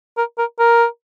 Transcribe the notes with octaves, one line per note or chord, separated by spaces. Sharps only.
A#4
A#4
A#4